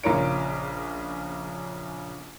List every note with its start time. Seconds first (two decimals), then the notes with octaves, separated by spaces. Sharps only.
0.03 A#1 C#3 F4 A#4 C#5 D7